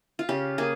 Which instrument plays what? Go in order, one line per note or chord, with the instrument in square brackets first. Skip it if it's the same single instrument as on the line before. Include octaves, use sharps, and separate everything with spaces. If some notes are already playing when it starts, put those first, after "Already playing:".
[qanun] F4
C#3 G4
A#3 G#4